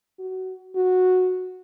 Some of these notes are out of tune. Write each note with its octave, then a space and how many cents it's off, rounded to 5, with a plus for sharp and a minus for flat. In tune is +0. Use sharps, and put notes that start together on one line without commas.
F#4 +20
F#4 -10